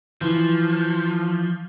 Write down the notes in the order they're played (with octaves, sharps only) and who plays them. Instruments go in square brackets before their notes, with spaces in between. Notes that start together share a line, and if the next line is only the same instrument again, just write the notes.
[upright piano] E3 [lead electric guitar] F3